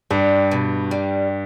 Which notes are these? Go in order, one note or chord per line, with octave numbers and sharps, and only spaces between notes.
G2 G3
B2
G3